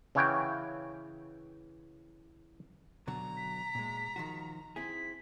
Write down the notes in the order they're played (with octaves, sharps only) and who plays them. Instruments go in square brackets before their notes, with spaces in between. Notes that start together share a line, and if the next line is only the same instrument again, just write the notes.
[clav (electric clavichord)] C#3 E3 C#5 F#5 G5
[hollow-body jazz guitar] B2 D3 F#3 [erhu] A#5
[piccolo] B6
[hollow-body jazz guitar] A#2 G#3
D#3 F3 F#4
[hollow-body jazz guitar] C4 E4 G#4 [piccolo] B6